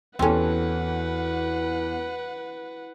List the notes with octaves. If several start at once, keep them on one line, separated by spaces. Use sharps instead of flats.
E2 E3 F#3 C4 C#4 A4 B4 F#5